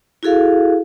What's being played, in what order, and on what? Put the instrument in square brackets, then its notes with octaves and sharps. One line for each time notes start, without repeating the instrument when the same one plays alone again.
[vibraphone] E4 F#4 G#4 A4 F5